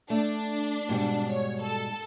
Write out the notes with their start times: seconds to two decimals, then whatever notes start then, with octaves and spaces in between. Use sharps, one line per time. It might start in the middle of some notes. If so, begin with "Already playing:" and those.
0.10 A3 D4
0.89 G#2 B2 G3
1.31 C#5
1.62 A4